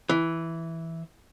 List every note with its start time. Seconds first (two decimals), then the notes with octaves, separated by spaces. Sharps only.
0.09 E3